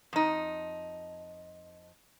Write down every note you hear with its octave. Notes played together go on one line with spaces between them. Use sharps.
F2 D#4